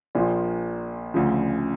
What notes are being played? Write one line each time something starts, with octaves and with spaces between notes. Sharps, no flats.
A#1 A#2 F3
D2 C#3 F3